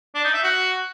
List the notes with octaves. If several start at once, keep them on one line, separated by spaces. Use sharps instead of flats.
D4
D#4
E5
F#4